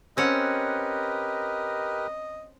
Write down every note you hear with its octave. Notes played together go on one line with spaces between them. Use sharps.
C4 C#4 G4 A#4 B4 D#5 F#5